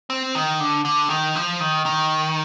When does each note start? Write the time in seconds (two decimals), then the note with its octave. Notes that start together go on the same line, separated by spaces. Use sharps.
0.10 C4
0.35 D#3
0.60 D3
0.85 D3
1.10 D#3
1.36 F3
1.60 D#3
1.86 D#3